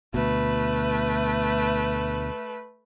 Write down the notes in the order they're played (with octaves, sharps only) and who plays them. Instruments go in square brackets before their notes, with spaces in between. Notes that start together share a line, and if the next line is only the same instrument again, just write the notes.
[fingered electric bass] D2 B2 [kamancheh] A3 B4